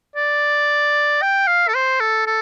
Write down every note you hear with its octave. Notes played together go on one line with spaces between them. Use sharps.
D5
G5
F5
A4
C5
A4
A4